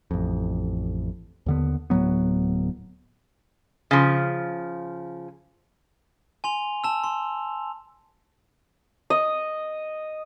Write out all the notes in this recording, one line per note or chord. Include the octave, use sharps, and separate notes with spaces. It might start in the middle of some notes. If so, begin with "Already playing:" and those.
A1 F2
D#2 D3 B3
D1 A2 F#3 B3
C#3 F3
G#5 C6 F7
A5 E6
C6
D#5